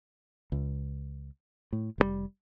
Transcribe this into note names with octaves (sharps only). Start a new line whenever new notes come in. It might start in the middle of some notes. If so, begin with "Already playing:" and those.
C#2
A2
F1 A#2 G3